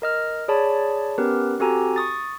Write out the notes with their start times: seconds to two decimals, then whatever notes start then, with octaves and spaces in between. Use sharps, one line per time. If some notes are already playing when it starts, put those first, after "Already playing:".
0.02 A#4 D#5 F6
0.48 G#4 C#5 D5 A5 B5
1.18 B3 C#4 G4 A#4 B4
1.60 C4 F#4 G4 A4 G#5 A#5
1.96 C#6 D#6 A6